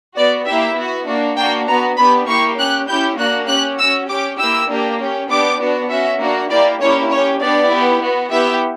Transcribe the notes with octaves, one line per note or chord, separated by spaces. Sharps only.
B3 F#4 D5
A#3 E4 G4 E5
B3 F#4
A#3 D4 F#4
A#3 D4 F#4 G5
B3 F#4 A#5
B3 D4 G4 B5
A#3 E4 G4 C#6
C#4 G4 F#6
C#4 E4 G4 G6
A#3 D4 F#4 F#6
C#4 G4 F#6
C#4 F#4 E6
C#4 G4 D6
A#3 E4 G4 E6
A#3 D4 G4
C#4 G4
B3 D4 G4 D6
B3 D4 F#4
C#4 F#4 E5
A#3 D4 F#4
A#3 E4 G4 D5
A#3 C#4 E4 G4 C#5
C#4 G4 C#5
B3 D4 G4 D5
B3 E4 G4
B3 F#4
B3 E4 G4 E5